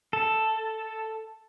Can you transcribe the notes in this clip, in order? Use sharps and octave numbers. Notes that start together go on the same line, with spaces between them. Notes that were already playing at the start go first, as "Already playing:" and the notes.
A4